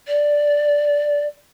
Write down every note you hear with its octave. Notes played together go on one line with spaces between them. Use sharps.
D5